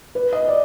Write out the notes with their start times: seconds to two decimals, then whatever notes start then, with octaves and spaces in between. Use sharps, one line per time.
0.15 B4
0.33 D#5
0.48 D5